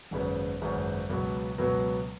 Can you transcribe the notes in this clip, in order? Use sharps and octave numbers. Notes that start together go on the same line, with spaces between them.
G#1 F#2 C#3 B3
G#1 F#2 C#3 B3
C#2 B2 F#3 B3
C#2 B2 F#3 B3